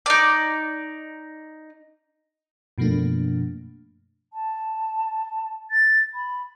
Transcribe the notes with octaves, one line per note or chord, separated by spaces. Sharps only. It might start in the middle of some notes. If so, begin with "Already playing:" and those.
D#4 D5
F#2 B2 F3 A3 A#3 D4
A5
A6
B5